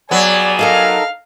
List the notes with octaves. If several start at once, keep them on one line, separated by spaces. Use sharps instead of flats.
F#3 G3 B3 G#4 D5 G#5
D#4 A4 A#4 F5